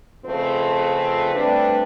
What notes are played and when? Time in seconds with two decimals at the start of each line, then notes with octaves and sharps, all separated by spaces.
0.25 F2 C#3 A3 C4 F4 B4
1.34 G3 A3 C4 D4 B4